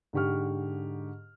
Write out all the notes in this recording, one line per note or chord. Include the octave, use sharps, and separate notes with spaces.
G#2 D3 G4 C#6 F6